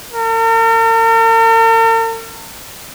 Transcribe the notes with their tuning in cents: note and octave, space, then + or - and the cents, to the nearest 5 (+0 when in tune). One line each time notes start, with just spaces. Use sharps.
A#4 -45